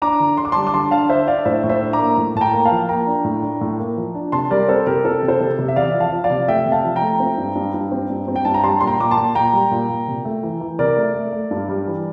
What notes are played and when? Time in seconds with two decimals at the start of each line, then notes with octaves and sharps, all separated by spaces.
0.02 D4 A#5 D6
0.20 D3
0.37 D4 C6
0.45 D6
0.52 G3 A5 C6
0.67 D6
0.74 D3 A5 C6
0.91 D4 F5 A5
1.09 D4 C5 E5
1.27 D4 D5 F5
1.45 A2 C5 E5
1.64 A2
1.69 C5 E5
1.81 D4
1.93 A#5 D6
1.99 A#3
2.17 A2
2.35 A2 A5
2.41 G5 A#5
2.53 A#3
2.65 F5 A5
2.71 F3
2.89 A#3 G5 A#5
3.07 D4
3.25 A2
3.43 D4
3.61 A2
3.79 A#3
3.97 F3
4.15 D4
4.32 C3 A5 C6
4.51 G3 A#4 D5
4.68 C4 A4 C5
4.86 C3 G4 A#4
5.05 C4 A4
5.23 C3
5.28 A4 C5
5.40 C3
5.59 C3
5.68 E5
5.76 E2 D5 F5
5.94 F3
6.00 F5 A5
6.12 F3
6.24 D5 F5
6.30 C3
6.48 A3 E5 G5
6.66 C3
6.72 F5 A5
6.84 F3
6.96 G5 A#5
7.02 A3
7.20 C4
7.38 G2
7.55 G2
7.74 G2
7.92 C4
8.10 G2
8.28 C4
8.36 G5
8.45 G2 A5
8.54 A#5
8.64 G3 A5 C6
8.81 A#2 C6
8.87 G5 A#5
9.00 A#2 D6
9.11 A5 C6
9.17 A#2
9.35 A#2 G5 A#5
9.53 G3
9.71 A#2
9.89 A#2
10.08 C3
10.25 A3
10.43 E3
10.61 E3
10.79 C3 A#4 D5
10.96 A3
11.14 A3
11.33 A3
11.51 G2
11.69 G3
11.87 E3